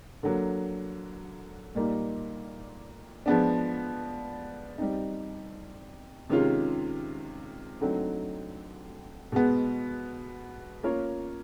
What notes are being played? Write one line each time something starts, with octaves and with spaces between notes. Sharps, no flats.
D3 F#3 A#3
A#2 G3 A#3 D#4
F3 G#3 B3 D4
G3 C4 D#4
C3 D#3 G#3 C#4 F4
D3 F#3 A3 C4 D#4
B2 G#3 B3
A#3 C#4 F4 A#4 C#5